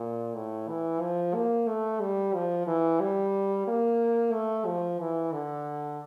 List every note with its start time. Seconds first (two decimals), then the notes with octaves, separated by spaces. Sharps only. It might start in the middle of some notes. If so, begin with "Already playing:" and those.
Already playing: A#2
0.35 A2
0.69 E3
1.01 F3
1.34 A#3
1.68 A3
2.01 G3
2.35 F3
2.67 E3
3.00 G3
3.67 A#3
4.32 A3
4.66 F3
4.99 E3
5.33 D3